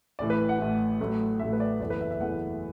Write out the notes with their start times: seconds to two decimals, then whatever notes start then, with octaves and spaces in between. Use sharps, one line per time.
0.19 A1 A2 E3 D5
0.30 B4
0.49 F#5
0.59 A1 A2 E3
1.00 A1 A2 F#3 A3
1.39 A1 A2 F#3 A3 E5
1.53 B4
1.60 D5
1.80 F#1 E2 E3 A3 D5
1.90 B4
2.00 E5
2.11 E5
2.20 F#1 E2 E3 A3 F#5